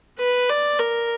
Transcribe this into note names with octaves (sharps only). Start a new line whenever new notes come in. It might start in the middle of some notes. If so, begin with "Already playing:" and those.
B4
D5
A#4